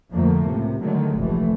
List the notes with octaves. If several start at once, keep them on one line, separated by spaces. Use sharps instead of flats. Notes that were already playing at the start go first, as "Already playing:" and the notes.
F2 D3 F3 A3 A#3
C#2 A2 C3
D3 D#3 F#3 G#3 A3
F1 A#1 E3 A3